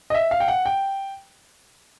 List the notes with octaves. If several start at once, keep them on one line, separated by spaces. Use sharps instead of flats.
D#5
E5
F5
G5
F#5
G5